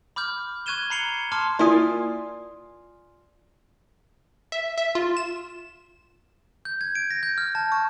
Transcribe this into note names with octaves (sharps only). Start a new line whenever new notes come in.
B5 D6 F6 G6
C#6 F#6 G#6 D#7 E7 G7
A#5 B5 C7 C#7 F7 G7
A5 C6 D6 F6
A#3 E4 F4 D5 G#5 D#6
E5
E5
F4
E7
G6
G#6
D7
A#6
G6
F6
A5
C#6